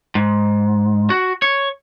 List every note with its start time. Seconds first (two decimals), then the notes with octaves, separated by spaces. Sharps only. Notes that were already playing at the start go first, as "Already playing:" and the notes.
0.15 G#2
1.10 F#4
1.42 C#5